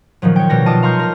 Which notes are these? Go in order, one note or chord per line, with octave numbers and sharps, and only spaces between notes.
A#2 D#3 F3 F#3
C#5 G5
B2 G3 F#4 A#6
F4 D#5 A5 D6
F5 A#5 C6 C#6 F6 G6
A#4 F6